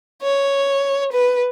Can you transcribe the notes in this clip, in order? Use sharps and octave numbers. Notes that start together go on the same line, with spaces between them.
C#5
B4